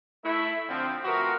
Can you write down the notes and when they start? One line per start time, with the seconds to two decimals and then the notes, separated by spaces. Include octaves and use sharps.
0.25 A3 E4
0.69 D3 F3 C4
1.04 F3 A3 B3 C4 F#4 A#4